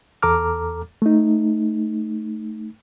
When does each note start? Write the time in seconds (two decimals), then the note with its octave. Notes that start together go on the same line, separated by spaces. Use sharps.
0.22 E2 A4 A#5 D6 F6
1.02 A3 D#4